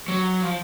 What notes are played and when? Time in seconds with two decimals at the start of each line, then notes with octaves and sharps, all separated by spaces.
0.08 F#3
0.42 F3